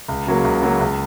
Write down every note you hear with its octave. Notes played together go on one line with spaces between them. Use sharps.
C#2
C#3 F#3 A#3
C#2
C#3 F#3 A#3
C#2